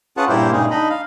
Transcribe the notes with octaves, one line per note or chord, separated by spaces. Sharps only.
C#4 F4 G#4 B4 F#5 A5
G2 A#2 A#3 E4 G4 C5
A#2 C#3 G3 G#3 D#4 G#4
D4 D#4 D#5 B5
F5